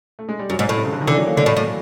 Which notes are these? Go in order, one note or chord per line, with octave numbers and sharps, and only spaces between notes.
A3
G#3
G3
F#2 F#3
G#2
A2
C3
C#3
D3
D#3
D3 E3
F#3
A#3
D3 A3
A2
A2